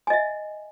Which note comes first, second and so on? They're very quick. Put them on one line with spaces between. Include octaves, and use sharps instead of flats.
G#5 D#5 E5